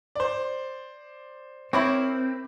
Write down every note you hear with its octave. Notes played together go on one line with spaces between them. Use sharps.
C5 D5
C4 E4 A#4 C#5 B5 D6